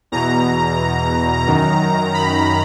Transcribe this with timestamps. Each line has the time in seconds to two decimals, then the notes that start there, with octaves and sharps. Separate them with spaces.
0.12 E2 B2 A#5
1.47 F#2 D#3
2.14 B5